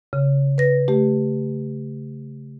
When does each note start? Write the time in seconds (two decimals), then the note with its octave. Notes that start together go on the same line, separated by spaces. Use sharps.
0.13 C#3
0.58 B4 A#6
0.88 A3 G4